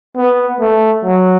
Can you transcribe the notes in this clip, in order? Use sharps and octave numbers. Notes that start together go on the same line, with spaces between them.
B3
A3
F#3